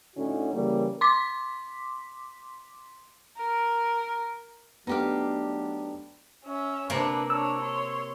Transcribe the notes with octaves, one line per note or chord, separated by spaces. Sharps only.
A2 D3 C#4 D#4 F#4
C#3 E3 G3 A#3
C6 D6 B6
A#4
F#3 A3 B3 D4 D#4 G4 F5
C#4 E5
C3 A#3 C4 D4 B4
D4 C#5 E6
C#5 C6